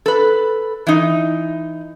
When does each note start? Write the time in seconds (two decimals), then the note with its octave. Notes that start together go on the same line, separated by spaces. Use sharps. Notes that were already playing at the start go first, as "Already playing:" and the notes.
0.06 A4 B4
0.87 E3 D#4